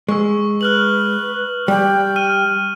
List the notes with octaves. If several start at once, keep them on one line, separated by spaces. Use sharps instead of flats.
G#3 C#6 E6
B4 F6 F#6 F#7
G3 G5
F6 D#7